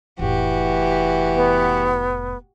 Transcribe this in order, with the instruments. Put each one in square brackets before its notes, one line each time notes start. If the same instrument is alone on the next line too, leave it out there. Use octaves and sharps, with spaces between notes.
[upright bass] F1 A2 [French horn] E3 [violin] F#4 G4
[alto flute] B3